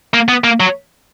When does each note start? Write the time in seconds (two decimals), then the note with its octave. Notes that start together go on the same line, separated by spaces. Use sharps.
0.14 A#3
0.28 B3
0.44 A#3
0.60 F#3